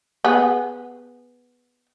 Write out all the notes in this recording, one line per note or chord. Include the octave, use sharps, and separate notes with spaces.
B3 G#4